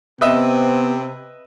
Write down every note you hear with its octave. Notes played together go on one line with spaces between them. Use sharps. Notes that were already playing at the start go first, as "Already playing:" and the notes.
C3 B3 C4 B4 D#5 E5